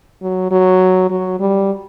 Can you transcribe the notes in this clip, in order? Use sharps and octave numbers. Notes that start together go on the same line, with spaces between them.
F#3
F#3
F#3
G3